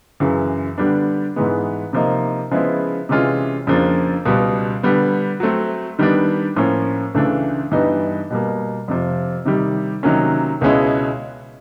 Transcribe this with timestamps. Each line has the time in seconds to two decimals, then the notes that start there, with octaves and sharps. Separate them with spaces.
0.20 F#2 C#3 E3
0.78 D3 G3 B3 D4
1.36 G#2 E3 G#3 B3
1.93 C3 F3 A#3 D#4
2.51 C#3 F3 G#3 B3 E4
3.09 C3 E3 G#3 C#4 F4
3.67 F2 C#3 F3 A#3 D4
4.25 C#2 B2 G3
4.83 D3 G3 B3
5.40 F#3 A3 C4
5.99 D#3 G3 B3 D4
6.56 A2 F3 A#3 C#4
7.15 C#2 C#3 E3 A3 D4
7.71 G2 E3 G3 B3 D#4
8.30 B2 G3 A#3
8.88 F2 C3 F3
9.45 C3 D#3 G3
10.03 C3 D#3 F#3 A#3 C#4
10.61 C#2 B2 G#3 C#4 E4